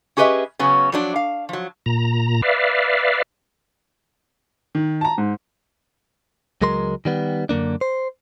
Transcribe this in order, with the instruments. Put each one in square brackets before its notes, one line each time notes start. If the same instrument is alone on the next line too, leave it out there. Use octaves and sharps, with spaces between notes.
[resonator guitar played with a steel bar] C#4 G4 G#4 B4 D#5 E5
C#3 F#3 B3 C#4
F3 F#3 D4
F5
F3 F#3
[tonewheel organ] A#2 A#5
B4 D5 E5 F5
[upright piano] D#3
A5 A#5
G#2
[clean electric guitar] C#2 F#3 G#3 A#4 C6
D#3 G3 B3
F#2 D3 A#3 D4
C5